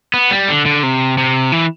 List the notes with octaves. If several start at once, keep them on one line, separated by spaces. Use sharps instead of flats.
B3
G3
D3
D3
C3
C3
E3